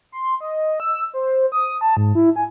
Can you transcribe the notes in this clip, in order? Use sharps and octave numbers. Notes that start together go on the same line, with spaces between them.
C6
D#5
E6
C5
D#6
A5
G#2
E4
G#5